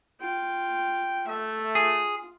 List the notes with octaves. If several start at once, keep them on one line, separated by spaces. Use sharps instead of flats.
F4 G5
A3 E5
F4 G#4